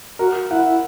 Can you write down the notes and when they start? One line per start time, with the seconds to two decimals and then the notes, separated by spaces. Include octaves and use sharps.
0.19 F#4 A#4
0.50 E4 F#5
0.65 E4